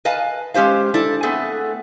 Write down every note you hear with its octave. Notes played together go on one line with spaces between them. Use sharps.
B4 D#5 F5 G#5 A5
G#3 C#4 G4 C5 F5
D4 E4 A4
A3 B3 C4 G#4 A4